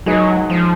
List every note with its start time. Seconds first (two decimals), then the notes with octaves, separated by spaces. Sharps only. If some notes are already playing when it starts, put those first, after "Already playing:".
0.06 F#3 G#3 D#4 G#4 B4 D#5
0.50 F3